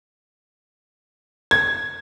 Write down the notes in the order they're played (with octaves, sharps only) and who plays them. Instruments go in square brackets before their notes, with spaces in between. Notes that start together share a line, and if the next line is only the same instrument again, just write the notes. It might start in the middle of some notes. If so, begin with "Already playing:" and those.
[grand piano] G#6